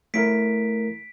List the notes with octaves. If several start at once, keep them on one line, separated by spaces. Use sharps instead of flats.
A3 E4 A#4 B6 D7